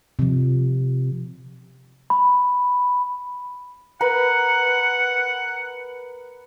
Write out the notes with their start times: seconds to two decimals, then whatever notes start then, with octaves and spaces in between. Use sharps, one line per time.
0.19 C3 F3
2.10 B5
4.01 A#4 B4 F#5 B5